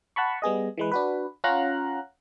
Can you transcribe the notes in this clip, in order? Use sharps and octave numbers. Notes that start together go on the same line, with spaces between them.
F#5 A5 B5 C#6
G3 B3 G#4 D#5
E3 G#3 B4
D4 F#4 B4
C#4 F4 F5 F#5 A#5 F#6